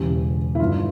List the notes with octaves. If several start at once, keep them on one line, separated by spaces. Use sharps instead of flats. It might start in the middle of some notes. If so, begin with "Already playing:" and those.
Already playing: E1 E2 C#3 G4
E4
G1 G2 D#3 F4